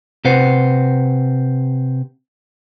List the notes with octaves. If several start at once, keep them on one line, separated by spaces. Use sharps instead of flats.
C3 B4 C5 F#5